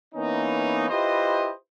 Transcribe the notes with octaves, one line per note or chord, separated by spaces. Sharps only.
E3 A#3 B3 C#4 D#4
E4 F4 G4 B4 C5 D#5